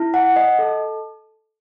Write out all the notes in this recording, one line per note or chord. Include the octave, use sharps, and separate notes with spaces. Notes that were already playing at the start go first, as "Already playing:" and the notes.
Already playing: E4
F#5
D#5
A4